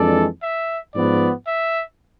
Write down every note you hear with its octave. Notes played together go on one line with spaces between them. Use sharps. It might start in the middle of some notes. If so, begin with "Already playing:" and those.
Already playing: F2 E3 G#3 D4 A4 D5
E5
G#2 F3 B3 D5
E5